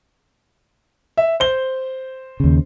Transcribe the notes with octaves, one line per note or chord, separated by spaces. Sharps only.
E5
C5 G7
D#2 C#3